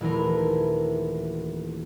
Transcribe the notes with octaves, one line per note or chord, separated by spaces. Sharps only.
D#1 E3 A3 A#4